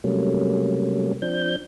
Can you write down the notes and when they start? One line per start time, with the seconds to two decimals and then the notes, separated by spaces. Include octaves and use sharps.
0.04 C3 F#3 G3 A3 A#3 C#4
1.22 F3 C4 D4 G6